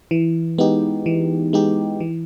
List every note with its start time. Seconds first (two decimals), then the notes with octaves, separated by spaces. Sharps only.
0.11 E3
0.58 G#3 B3 D#4 G4
1.06 E3
1.53 G#3 B3 D#4 G4
2.00 E3